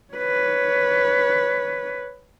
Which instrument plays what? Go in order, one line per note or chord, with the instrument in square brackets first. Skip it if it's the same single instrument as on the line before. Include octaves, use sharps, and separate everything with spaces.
[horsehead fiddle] B4 C#5